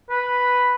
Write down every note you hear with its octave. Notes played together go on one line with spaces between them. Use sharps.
B4